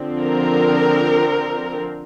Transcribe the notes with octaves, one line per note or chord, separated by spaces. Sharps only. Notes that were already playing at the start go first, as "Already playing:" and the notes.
Already playing: D3 F3 C4
A#4